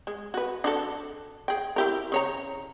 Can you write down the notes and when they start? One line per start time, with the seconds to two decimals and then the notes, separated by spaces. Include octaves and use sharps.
0.07 G#3
0.34 F#4 B4
0.64 D4 F#4 A4
1.48 G#4 G5
1.76 E4 G4 A#4
2.12 C#3 C#5 A#5